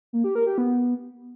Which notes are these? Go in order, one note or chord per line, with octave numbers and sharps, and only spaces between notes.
A#3
G4
A#4
G4
B3